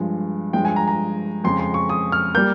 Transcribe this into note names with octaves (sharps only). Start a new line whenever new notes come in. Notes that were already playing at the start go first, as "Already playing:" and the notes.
Already playing: G2 F3 G#3
G2 F3 G#3 G5
G#5
A#5
A#5
F2 C#3 G#3 C6
C6
C#6
D#6
F6
G3 A#3 G6